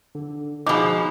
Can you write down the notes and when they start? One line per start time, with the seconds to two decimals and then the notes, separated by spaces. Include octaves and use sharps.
0.15 D3
0.66 B2 F3 D#4 G#4 B5 D6